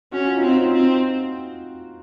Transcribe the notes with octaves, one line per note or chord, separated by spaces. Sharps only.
C#4 F#4
F4
D#4
C4
F4
C4